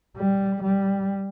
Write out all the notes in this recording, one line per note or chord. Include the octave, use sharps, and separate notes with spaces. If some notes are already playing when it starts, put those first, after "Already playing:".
G3
G3